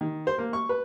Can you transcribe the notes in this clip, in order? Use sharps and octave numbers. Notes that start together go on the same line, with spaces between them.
D#3
C5
A#3
C#6
B4